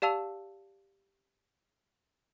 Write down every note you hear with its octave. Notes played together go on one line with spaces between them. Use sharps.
G4 D5 F5 A5 E6 F7